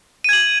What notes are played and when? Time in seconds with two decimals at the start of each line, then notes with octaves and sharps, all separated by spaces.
0.24 D#7
0.29 G#6
0.33 F#7